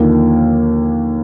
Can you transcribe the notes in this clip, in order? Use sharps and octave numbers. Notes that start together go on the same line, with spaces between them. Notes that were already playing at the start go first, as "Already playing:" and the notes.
Already playing: D#2 D3 F3 A#3